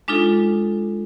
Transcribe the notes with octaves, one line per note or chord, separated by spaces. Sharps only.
G#3 D4 D#4 F4 A4